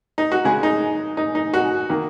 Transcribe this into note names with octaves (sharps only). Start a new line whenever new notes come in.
D#4
F#4
C#3 G#3 G#4
D#4
D#4
D#4
F#4
D#3 A#3